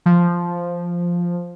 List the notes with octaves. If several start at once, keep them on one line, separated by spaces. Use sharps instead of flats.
F3